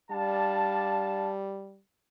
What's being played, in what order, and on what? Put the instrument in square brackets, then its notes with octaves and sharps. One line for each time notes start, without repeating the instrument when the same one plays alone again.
[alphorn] G3 [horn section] D4 F5 A5